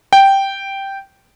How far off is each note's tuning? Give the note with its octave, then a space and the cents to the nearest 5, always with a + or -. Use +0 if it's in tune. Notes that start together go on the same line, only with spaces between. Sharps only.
G5 -5